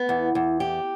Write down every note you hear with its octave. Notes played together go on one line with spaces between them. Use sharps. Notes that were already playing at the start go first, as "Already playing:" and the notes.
Already playing: B3
E2
E2
G4